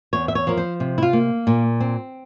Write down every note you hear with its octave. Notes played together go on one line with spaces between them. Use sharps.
E2 C#5
E5
C#5
F3 A#4
C5
C3
E4
F4
A#3
A#2
C4